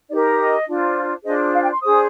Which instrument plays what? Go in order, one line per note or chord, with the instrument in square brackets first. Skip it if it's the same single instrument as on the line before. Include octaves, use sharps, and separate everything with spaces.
[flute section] D#4 G4 A#4 D5
D#5
D4 F4 C5
D4 F4 G#4 C5 D#5
F5
G5
C6
D4 G#4 C5 D#6